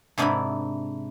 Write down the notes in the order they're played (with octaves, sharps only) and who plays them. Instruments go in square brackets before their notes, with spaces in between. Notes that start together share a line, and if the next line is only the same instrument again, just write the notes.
[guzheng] G#2 C3 D4 E4 A#4 B5